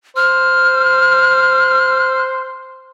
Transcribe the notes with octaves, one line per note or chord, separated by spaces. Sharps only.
C5 F6